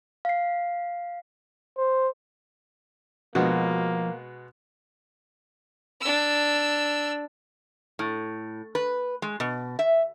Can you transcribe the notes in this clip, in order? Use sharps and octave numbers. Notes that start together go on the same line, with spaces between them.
F5 C7
C5
B2 F3 G#3 A#3 B3 F#4
D4 E6
A2
B4
G#3
B2
E5